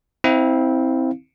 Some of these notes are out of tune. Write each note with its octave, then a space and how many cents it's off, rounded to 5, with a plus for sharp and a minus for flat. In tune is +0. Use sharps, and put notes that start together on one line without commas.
C4 +0 E4 -30 F5 +0